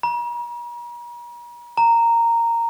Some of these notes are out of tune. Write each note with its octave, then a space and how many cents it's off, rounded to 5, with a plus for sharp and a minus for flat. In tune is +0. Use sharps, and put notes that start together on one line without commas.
A#5 +45
A#5 -10